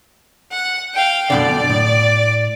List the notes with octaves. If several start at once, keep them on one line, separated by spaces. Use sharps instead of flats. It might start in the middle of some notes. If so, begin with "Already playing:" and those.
F#5
F5 G5
F#2 B2 D3 D5
A2